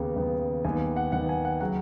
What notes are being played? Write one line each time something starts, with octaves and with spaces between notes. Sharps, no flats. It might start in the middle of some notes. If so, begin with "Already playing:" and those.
Already playing: D#2 C#3 B3
D#2 C#3 B3
D#2 D#3 B3 G#5
F#5
D#2 D#3 B3 F#5
G#5
F#5
C#3 F#3 F#5